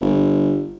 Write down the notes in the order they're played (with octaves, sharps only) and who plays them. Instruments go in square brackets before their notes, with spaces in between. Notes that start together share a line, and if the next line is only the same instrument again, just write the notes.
[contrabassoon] G1